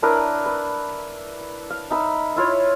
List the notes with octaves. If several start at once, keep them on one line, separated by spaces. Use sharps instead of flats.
D4 E4 A#4 B4
B4
F5
D#4 E5 B5
E4 F4 C#5